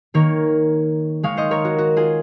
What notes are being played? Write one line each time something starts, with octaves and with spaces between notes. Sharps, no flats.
D#3 A#3 A#4 C#5
D#3 G#3 C#5 F5
C5 D#5
A#4 C#5
F#4
F#4
F4 G#4